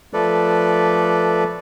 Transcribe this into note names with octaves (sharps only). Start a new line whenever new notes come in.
F3 A3 A4 B4 D5